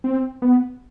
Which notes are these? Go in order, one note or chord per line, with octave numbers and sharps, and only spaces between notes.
C4
B3